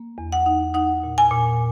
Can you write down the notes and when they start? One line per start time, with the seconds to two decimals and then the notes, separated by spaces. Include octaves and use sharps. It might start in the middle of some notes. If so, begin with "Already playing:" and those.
Already playing: A#3
0.18 E2
0.32 F#5
0.46 D#4
0.74 D#4 F#5
1.03 A#2
1.18 G#5
1.31 A#2